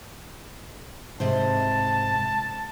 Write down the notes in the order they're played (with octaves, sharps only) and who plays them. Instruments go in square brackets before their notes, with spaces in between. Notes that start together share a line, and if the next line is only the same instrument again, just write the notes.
[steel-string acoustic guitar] G#2 C3 C5 [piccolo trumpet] A5